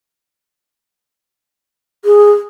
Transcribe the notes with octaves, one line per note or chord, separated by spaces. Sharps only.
G#4